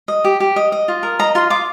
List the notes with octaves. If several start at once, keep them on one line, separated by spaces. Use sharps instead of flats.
D#5
G4
G4
D#5
D#5
F4
A#4
D#5 A#5
F4 C6
F4 D6